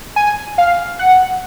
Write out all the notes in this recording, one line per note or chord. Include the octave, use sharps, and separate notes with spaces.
G#5
F5
F#5